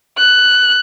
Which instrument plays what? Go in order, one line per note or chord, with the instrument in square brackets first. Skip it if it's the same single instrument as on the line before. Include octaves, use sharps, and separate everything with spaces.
[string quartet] F#6